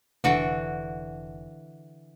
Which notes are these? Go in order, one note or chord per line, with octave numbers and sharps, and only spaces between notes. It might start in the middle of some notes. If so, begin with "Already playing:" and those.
F1 D3 E3 F#4